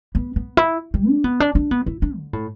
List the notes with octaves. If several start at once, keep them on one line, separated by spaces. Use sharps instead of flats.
B3
B3
E4
G3
D4
B3
D4
D4
B3
E4
D4
D3
A2